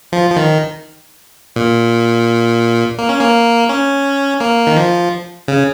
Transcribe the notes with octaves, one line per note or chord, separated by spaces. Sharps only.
F3
F3
D#3
A#2
A#3
C#4
A#3
C#4
A#3
D#3
F3
C#3